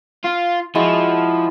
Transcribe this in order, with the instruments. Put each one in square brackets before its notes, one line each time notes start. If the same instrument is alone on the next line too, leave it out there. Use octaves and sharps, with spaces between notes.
[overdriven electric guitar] F4
[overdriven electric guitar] F3 [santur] G#3 E4 F#4